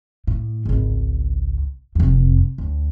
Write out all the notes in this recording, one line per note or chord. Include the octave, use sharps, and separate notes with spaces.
A2
G#1 C#2
F1 F2
D2